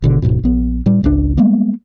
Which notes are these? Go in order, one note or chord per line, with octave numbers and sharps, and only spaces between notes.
G#1 B2 D3
D1 C2 G#2 B2
A#1 B3
A2 G3
G#1 C#2 C#3 D4
G3 G#3 A#3 B3